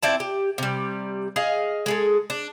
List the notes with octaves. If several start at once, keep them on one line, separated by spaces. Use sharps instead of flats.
C4 E4 D5 A5
G4
C3 G3
G#4 D#5 F5
G#3 G#4 A4
D4